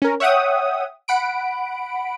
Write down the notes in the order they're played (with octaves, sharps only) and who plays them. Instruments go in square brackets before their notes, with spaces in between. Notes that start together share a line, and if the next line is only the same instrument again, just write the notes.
[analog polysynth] C#4 A#4
C#5 E5 F#5 G5 D#6
F#5 B5 D7